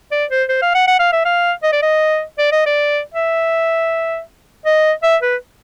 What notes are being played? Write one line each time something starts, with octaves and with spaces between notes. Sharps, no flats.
D5
C5
C5
F5
F#5
F#5
F5
E5
F5
D#5
D5
D#5
D5
D#5
D5
E5
D#5
E5
B4